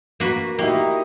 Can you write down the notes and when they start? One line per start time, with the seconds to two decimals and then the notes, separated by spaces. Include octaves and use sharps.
0.20 A#3 F#4 B4
0.59 A#3 D#4 E4 F#4 G4